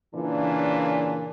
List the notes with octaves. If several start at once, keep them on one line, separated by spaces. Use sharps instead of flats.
A#2 C#3 E3 D4